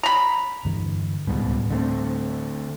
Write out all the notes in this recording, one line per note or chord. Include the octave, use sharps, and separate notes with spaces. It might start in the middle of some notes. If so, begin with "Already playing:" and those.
A#5 B5
G2 D3 E3
D1 C#2 G#2 B2 G3
D3 A3 C4